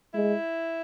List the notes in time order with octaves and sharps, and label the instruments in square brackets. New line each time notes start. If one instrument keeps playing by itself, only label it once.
[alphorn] G#3 [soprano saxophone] E4